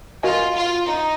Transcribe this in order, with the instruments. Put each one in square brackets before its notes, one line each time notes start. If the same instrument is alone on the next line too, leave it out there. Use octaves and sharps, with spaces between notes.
[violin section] F4 [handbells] F#4 A#4 D#5 G#5
[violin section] F4
D#4